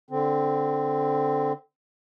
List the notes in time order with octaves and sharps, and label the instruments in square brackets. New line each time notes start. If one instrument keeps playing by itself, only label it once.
[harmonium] D3 C4